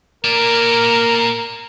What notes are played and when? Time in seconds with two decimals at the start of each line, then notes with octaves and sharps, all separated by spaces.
0.25 A#3 A#4 D5